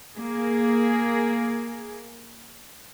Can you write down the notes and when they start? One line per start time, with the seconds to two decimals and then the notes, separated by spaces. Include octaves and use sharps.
0.16 A#3 G#4